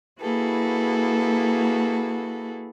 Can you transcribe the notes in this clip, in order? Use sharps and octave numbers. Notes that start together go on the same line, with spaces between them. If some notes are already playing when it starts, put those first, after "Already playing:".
A#3 E4 F#4 G#4 A4 B4